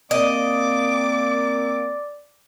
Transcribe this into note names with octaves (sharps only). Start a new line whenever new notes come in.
A#3 C4 D5 D#5 D6